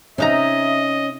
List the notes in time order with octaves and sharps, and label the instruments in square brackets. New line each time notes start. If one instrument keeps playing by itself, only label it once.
[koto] C3 D#4 A#5 [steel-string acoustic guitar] C#4 [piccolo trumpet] D#5 [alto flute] E5